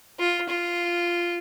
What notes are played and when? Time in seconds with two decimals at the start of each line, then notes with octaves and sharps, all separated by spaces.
0.19 F4
0.49 F4